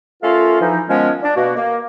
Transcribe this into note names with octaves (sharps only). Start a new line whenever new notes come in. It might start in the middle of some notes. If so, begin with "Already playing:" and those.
A3 C#4 F4 A4 A#4 F5
E3 F3 D#4
D#3 F3 G#3 B3 C#4
D4
B2 A#3 F#4
A#3